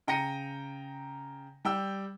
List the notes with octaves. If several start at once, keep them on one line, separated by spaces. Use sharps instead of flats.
C#3 G5 A#5 A#6 C#7 D#7
G3 G5 E6